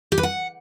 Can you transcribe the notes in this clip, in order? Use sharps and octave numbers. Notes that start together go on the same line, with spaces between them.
G4
B4
F#5